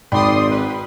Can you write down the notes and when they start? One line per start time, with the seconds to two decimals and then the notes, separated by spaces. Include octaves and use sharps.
0.12 G#1 G#2 D5 G5 B5 C6 D#6
0.50 B4